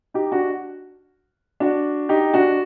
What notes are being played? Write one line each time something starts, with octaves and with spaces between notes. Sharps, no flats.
D#4 G4
D4 F#4
D4 F#4
D#4 G4
D4 F#4